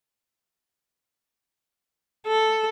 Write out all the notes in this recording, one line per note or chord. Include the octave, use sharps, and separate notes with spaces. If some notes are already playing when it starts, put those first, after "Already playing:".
A4